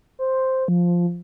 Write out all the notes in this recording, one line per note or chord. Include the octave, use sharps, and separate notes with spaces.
C5
F3